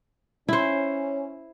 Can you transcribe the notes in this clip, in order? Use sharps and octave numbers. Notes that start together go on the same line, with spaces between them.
C#4 E4 C5